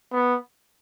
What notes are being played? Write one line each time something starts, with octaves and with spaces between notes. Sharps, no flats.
B3